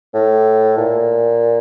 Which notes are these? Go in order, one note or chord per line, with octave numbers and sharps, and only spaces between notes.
A2
A#2